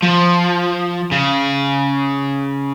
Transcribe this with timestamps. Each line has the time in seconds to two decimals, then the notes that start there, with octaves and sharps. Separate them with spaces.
0.03 F3
1.12 C#3